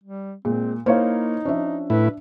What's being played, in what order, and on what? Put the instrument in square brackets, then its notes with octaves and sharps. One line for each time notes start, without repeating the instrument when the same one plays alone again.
[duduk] G3
[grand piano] A#2 [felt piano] G#3 [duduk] C4
[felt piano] A#3 E4 [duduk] D#4 [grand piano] C5 C#5 F5
[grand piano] F3 C#4 [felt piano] D4 E5
[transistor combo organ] A2 E4 [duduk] B4